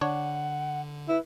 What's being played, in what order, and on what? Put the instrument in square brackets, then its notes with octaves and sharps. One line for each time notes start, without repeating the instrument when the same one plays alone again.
[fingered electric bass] D3 [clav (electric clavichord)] D4 C#5 [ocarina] F#5
[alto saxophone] E4 [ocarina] B4